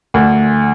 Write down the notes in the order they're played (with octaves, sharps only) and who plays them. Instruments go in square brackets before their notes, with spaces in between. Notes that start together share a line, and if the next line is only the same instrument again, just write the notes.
[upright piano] D2